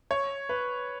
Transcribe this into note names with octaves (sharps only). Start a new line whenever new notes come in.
C#5
B4